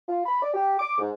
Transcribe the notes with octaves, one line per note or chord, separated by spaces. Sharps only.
F4
B5
D5
G4
D6
G#2